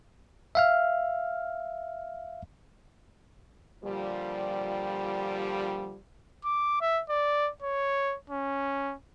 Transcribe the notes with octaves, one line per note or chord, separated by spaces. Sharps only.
E5 F5 F6
A#2 D3 F3 G3
D6
E5
D5
C#5
C#4